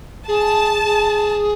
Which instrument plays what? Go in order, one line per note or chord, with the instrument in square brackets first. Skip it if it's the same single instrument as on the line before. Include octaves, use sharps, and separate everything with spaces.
[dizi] G#4 [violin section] A5
[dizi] G#4